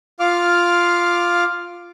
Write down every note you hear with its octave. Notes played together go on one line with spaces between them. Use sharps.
F4 F5 D6 F6